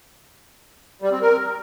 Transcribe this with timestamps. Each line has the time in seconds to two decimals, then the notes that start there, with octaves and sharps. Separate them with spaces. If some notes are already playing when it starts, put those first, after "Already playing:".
1.02 G3
1.12 C4
1.22 A#4